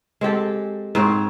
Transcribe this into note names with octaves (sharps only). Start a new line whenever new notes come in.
G#3 C4 G4 A4
G#2 C4 C5 C#5